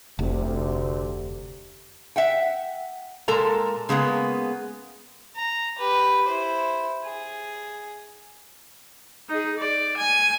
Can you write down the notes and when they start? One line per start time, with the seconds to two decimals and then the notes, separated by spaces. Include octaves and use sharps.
0.19 F1 D2 C3
2.16 E5 F#5 G5
3.28 A#2 G#3 A4 A#4 A#5
3.89 C#3 G#3 A#3 B3
5.36 A#5
5.78 G4 B4
6.28 E4 C5
7.04 G#4
9.29 D#4 G#4
9.58 D5
9.97 G#5